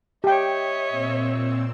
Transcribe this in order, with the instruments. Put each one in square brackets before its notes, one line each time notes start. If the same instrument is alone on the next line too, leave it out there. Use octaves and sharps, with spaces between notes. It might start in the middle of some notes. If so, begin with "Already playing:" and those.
[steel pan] G4 G5 [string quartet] C#5 D#5 E5
[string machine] A#2 C4 E6